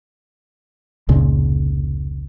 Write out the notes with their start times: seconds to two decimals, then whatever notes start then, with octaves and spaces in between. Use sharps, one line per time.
1.09 F1 C#2 A#2 C#3